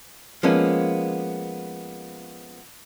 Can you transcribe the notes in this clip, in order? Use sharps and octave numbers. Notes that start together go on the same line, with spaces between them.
F3 G#3 A#3 B3 C#4